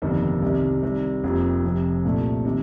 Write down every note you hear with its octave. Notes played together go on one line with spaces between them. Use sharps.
G1 F2 C3 D#3 A#3
C2 C3 D#3
C3 D#3 G3
F1 F2 C3 F3 A#3
F1 F2 C3
C2 A#2 A3
C3 D#3 A#3